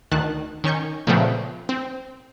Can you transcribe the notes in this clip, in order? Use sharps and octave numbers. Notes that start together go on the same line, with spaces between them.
D2 D#3 A5 F#6
D#3 C#4 C#6 G6
A#2 C#3 F3 A3 B3 C4
C4